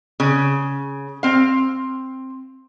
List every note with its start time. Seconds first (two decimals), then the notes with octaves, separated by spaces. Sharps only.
0.20 C#3
1.23 C4 F5